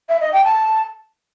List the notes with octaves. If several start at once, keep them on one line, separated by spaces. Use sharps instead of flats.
E5
D#5
G5
A5